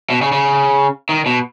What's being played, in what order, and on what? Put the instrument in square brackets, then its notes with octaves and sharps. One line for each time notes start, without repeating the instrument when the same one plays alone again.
[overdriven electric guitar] B2
C#3
C#3
D#3
B2